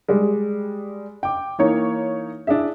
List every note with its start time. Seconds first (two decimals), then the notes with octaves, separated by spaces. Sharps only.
0.08 G3 G#3
1.23 G5 D6
1.58 E3 A#3 D#4 C#5
2.47 D4 E4 G#4 E5